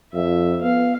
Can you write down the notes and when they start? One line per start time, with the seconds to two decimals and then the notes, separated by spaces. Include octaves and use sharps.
0.14 F2 E5
0.62 B3 F5